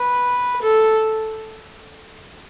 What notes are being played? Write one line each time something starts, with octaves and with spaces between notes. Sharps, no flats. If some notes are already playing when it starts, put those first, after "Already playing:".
Already playing: B4
A4